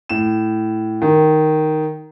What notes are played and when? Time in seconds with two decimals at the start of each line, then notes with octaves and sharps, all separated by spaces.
0.09 A2 E7
1.02 D#3